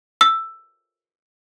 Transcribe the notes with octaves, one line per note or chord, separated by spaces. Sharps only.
E6